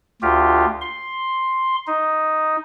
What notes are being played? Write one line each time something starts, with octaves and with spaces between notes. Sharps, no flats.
D2 F4 G4
C6
D#4